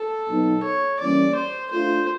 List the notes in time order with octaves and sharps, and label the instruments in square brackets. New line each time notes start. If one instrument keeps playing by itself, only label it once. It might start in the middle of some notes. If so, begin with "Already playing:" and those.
Already playing: [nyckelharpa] A4
[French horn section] B2 F#3 B3 D#4
[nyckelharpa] C#5
[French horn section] E3 G3 A#3 C#4 [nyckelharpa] D5
[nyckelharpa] C5
[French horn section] A3 D4 F4 [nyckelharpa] C5